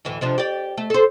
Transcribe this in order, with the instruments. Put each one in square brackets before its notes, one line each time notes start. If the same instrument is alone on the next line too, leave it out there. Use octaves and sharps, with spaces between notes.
[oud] D2 A2 E3
C3 F3 D4
G4 D5
A3
A4 C5